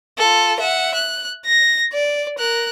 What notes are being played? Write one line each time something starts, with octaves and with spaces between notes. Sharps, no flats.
F4 A4
E5 F#5
F#6
A#6
D5
A#4 F#6